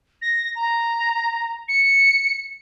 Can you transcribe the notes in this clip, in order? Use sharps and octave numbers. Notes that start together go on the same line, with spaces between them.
A#6
A#5
C#7